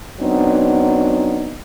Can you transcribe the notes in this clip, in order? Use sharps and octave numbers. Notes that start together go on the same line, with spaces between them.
F#3 B3 C4 D4 D#4